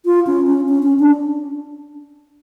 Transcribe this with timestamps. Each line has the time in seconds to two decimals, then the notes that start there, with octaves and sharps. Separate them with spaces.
0.05 F4
0.27 C#4
0.46 C#4
0.68 C#4
0.82 C#4
0.99 D4